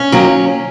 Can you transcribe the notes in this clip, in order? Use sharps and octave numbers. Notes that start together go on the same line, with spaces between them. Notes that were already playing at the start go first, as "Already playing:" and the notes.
Already playing: C#4
D#3 F#3 A#3